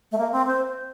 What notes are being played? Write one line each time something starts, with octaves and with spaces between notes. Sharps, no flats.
A3
A#3
C4
C5